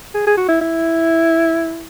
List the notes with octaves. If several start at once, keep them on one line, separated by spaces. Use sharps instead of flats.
G#4
G#4
F#4
E4
E4